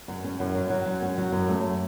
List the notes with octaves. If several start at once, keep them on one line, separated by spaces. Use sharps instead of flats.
F#2
C#4
F#2
F#3
F#3
F#2
C#4
F#3
F#2
A3